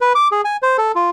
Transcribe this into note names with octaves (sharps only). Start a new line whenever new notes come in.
B4
D6
G#4
G#5
C5
A4
F4